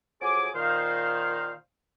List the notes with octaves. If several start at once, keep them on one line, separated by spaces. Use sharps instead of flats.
F2 F#3 G#4 G#5 D6
A#2 D#3 C5 F5